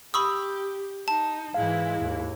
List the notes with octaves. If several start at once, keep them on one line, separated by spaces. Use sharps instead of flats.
G4 B5 C#6 D#6 E6
D#4 A5
G#2 E3 G#3 E4 F5
D#2 G#2